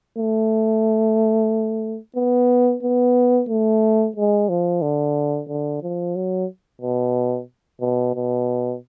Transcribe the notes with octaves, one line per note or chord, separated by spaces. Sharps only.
A3
B3
B3
A3
G#3
F3
D3
D3
F3
F#3
B2
B2
B2